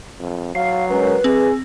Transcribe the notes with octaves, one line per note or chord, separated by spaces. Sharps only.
F2
F#3 F5 C7
G#3 C#4 A#4 B4
C4 G#4